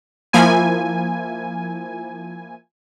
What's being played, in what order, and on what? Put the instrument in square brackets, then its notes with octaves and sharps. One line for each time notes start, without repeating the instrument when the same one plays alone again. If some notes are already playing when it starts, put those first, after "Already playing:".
[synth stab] F3 A#3 E4 G#5